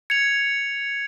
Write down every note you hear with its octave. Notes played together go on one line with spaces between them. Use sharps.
G#6 C#7 F7